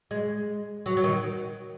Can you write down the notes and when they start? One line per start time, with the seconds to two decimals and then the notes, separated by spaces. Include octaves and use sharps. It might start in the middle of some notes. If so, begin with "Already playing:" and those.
0.11 G#3
0.86 F#3
0.97 F#3
1.04 D#3